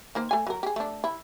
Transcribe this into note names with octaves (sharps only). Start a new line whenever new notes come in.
D#3 A#3 C5
A3 G#5
F#3 A#4
G4 G#4
A3 D4
E4